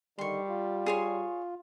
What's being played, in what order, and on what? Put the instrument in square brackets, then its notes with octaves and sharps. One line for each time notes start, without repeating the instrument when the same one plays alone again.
[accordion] D3 D#3 [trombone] G3 [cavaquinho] C6 C#6
[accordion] F4
[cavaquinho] G#4 C#5 C6